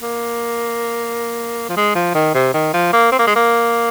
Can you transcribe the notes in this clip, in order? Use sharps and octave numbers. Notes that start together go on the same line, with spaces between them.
A#3
F3
G#3
F3
D#3
C3
D#3
F3
A#3
C4
A#3
G#3
A#3